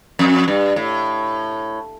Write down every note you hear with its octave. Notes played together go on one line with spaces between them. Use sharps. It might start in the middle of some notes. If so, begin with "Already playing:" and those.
F2
G2
A2